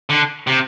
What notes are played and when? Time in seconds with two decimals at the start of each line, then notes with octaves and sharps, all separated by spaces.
0.10 D3
0.47 C3